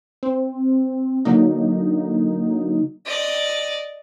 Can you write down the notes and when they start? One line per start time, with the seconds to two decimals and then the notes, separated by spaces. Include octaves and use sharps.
0.23 C4
1.25 D3 F#3 A#3 D#4
3.06 D5 D#5